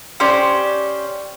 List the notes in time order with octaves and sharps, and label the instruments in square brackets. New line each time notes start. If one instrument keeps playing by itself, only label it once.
[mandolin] C#4 G4 C5 D5